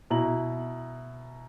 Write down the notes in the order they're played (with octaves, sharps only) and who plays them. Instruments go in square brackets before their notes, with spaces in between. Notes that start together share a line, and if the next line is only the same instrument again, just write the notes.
[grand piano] B2 E4 A#5 F#7